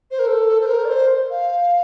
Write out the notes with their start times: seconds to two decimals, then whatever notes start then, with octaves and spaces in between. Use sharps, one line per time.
0.11 C5
0.19 A#4
0.27 A4
0.61 C5
0.66 A#4
0.85 D5
0.89 C5
1.31 F5